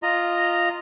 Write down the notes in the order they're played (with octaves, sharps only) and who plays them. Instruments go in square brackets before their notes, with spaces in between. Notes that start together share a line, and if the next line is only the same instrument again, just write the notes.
[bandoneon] F4 D#5 A#5